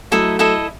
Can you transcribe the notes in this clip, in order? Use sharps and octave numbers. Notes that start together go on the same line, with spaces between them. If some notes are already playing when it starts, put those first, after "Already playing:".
F#3 A3 E4 A4 D#5
E4 A4 D#5